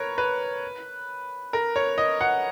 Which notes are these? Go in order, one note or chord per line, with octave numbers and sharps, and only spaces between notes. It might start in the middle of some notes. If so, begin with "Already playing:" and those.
Already playing: A#4 B4 C#5
B4
A#4
C#5
D#5
F#5